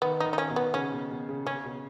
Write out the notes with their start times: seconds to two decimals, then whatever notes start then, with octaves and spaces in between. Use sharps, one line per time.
0.02 D#3 B3
0.20 D#4
0.26 D#3
0.33 D#4
0.38 C#4
0.50 B2
0.56 B3
0.74 C#3 C#4
0.92 B2
1.11 B2
1.29 C#3
1.46 C#3 C#4
1.65 B2